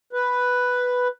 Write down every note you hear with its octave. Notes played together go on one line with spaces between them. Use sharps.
B4